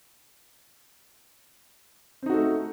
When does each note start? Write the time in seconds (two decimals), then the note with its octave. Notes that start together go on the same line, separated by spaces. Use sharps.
2.23 C4
2.26 D#4
2.30 F#4
2.33 A4
2.37 A3